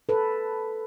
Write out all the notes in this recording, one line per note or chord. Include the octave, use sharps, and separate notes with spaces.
A4 B4